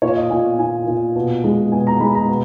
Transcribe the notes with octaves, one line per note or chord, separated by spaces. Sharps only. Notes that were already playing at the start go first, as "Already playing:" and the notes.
A#2 C#5
D#5
A#2 G#5
A#2 G#5
A#2
B2
G#3
B2 G#5
A#5
G#3 B5
A#5
B2